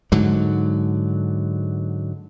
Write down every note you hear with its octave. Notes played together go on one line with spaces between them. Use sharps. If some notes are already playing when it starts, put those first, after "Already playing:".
G#2 D3 F#3